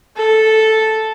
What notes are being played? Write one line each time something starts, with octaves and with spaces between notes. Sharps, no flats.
A4